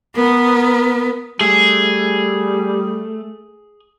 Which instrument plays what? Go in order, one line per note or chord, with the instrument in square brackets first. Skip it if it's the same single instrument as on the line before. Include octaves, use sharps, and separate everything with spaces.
[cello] B3 [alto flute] A#4
[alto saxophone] G3 [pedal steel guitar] A3 [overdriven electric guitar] G#4